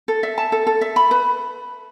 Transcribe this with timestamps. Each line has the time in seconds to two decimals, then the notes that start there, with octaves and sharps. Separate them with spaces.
0.08 A4
0.23 E5
0.38 A5
0.52 A4
0.67 A4
0.81 E5
0.96 B5
1.11 B4